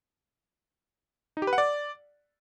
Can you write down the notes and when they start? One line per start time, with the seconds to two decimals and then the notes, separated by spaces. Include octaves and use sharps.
1.37 D#4
1.42 G4
1.47 B4
1.53 F#5
1.58 D5